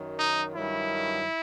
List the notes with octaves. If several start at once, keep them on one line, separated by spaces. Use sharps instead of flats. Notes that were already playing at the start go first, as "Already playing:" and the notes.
Already playing: F#2 D#3 F#3
D#4
G2 D#3 F#3 E4